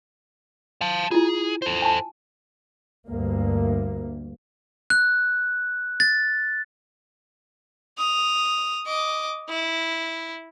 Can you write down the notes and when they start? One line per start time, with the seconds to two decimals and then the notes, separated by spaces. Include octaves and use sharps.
0.81 F5 A5
1.11 E4 F4 G#4
1.62 A4 C5
1.82 G#5 A5
3.09 D2 G2 A#3
4.90 F#6
6.00 A6
7.97 D#6 F7
8.86 D#5 D6
9.49 E4